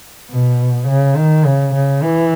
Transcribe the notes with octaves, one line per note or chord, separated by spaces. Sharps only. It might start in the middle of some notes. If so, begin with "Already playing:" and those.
B2
C#3
D#3
C#3
C#3
E3